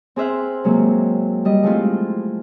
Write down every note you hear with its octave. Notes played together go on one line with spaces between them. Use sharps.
C4 G#4 C5 E5 F6 F#6
C3 F#3 G#3 A#3
G3 D#5
F3 G#3 A3 C4 E4 F4